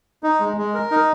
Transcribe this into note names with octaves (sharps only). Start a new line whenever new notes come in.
D#4
G#3
G#3
A#4
D#4